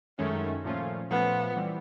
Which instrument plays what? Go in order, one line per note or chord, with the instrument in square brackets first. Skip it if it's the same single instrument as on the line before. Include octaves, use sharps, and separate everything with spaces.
[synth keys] F#2 D#3 G#3 C#4 [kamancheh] A3
[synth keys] A#2 F3 A3 C#4 F4
[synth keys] A#2 F3 A3 C#4 F4 [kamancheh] B3
[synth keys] E3 G3 C4